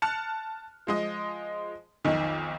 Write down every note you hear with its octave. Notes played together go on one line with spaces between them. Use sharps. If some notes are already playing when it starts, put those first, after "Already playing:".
A5 F6 F#6 C#7
F3 G#3 D#5
B1 F2 D#3